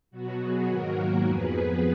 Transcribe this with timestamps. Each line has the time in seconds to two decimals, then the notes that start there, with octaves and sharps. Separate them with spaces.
0.11 B2 F#3 B3 F#4
0.39 G#4
0.67 G#2 D#3 F#3 A#3 F#4 A#4
1.23 F2 F3 B3 G#4 B4